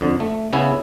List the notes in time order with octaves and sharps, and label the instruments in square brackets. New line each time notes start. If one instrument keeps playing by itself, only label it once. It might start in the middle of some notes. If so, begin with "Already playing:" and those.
[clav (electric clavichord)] F2 D3
A3
C#3 B3 C#4 E4